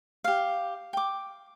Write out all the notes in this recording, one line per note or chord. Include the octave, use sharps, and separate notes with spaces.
G4 F5
G5 D6